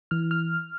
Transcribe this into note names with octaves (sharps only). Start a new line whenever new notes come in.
E3 F6
F6